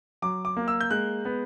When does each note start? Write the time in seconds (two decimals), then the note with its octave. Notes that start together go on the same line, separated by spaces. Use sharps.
0.22 F#3 D6
0.45 D6
0.57 A#3
0.68 E6
0.81 G6
0.91 G#3 F#6
1.25 B3